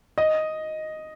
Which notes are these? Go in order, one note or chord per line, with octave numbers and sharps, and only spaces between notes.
D#5